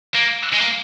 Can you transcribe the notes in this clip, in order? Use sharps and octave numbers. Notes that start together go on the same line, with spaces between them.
A#3
G#3
A#3